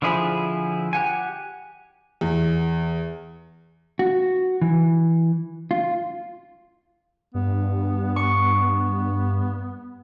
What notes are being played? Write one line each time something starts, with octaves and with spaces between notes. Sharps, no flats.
D3 F3 E4 G#4 B5
G4 F#5 G#5
E2
F#4
E3
F4
G2 B3
C#6